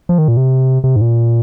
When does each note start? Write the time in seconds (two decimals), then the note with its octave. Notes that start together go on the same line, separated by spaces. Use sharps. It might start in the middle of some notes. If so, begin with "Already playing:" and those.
0.09 F3
0.18 D#3
0.28 A#2
0.37 C3
0.84 C3
0.96 G#2
1.01 A#2